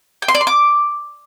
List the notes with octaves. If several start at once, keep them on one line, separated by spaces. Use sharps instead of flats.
G5
C6
D5
C6
D6